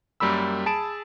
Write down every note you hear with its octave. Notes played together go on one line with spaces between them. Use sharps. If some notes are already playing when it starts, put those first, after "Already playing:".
F#2 G3 A#3 B5 E6
G#4 A5 B5 D7 E7